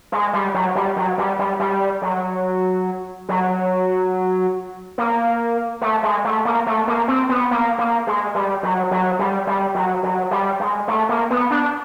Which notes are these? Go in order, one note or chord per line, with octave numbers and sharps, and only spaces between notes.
G#3
G3
F#3
G3
F#3
G3
G3
G3
F#3
F#3
A#3
A3
G#3
A3
A#3
A3
A#3
C4
B3
A#3
A#3
G#3
G3
F#3
F#3
G3
G3
F#3
F#3
G3
G#3
A3
A#3
B3
D4